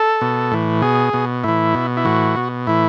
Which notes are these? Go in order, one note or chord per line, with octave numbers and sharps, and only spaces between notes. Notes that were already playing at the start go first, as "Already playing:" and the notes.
Already playing: A4
B2
A2 E3
B2 G#4
B2
A2 E3 E4
B2
E4
A2 E3 F#4
B2
A2 E3 E4